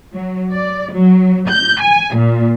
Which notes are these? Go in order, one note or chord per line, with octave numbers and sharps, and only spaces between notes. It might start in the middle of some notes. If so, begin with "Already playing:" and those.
F#3
D5
F#3
G6
G#5
A#2